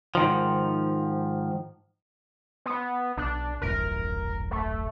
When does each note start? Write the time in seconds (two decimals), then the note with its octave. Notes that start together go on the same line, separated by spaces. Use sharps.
0.15 G#2 D#3 F3
2.66 B3
3.17 B1 D4
3.62 D#1 A1 F#2 A#4
4.51 A3